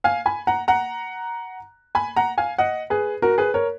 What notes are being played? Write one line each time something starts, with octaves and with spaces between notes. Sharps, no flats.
F5 G#5
G#5 B5
F#5 A#5
F#5 A#5
G#5 B5
F#5 A#5
F5 G#5
D#5 F#5
G#4 B4
F#4 A#4
G#4 B4
A#4 C#5